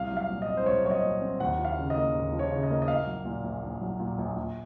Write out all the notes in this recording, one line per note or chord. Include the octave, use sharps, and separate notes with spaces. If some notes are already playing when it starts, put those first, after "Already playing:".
Already playing: C2 F5
F#3
F5
A#2
D#5
C4
C5
C2 C#5
F#3 C#5
D#5
A#2
C4
D#2 F#5
F3
F5
C#3
D#5
A#3
D#2
F3
C#5
C#3
D#5
A#3
D#5
A#1 F5
F#3
A#2
A#1
A#1
F#3
A#2
A#1
A#1